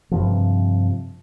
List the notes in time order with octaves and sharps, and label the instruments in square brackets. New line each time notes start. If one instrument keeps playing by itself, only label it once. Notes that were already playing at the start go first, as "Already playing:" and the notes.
[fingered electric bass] G2 C3 F3